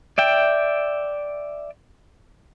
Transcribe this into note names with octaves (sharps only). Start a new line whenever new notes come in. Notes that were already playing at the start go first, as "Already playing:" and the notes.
D5 E5 G5